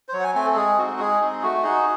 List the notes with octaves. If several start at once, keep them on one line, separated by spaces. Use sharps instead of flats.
C5
F#3 C#5
F#5
G#5
A3 C4 G#5
A4
G#3 G#4
C4 D#4 F#4
G#3 G#4
C4 D#4
A3 F#4
D#4 F#4 G#4